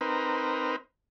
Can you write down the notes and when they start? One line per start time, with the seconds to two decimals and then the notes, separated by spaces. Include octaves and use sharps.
0.01 C4 D#4 A#4 B4